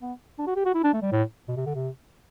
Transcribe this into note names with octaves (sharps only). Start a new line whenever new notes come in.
B3
D4
F#4
G4
F#4
E4
D4
A3
G3
A2
B2
C3
D3
C3